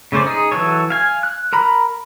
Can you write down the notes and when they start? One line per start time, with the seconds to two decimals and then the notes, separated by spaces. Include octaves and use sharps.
0.12 C#3 A3 C#4 C5 D5
0.26 D#4 G#4
0.52 E3 F#3 A4 C#5
0.90 F5 G#5
1.23 F#6
1.53 A#4 A#5 B5